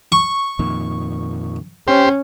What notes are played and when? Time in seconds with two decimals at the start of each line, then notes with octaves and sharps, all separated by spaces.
0.12 C#6
0.59 F2 A#2 D#3
1.88 C#4 G4 C5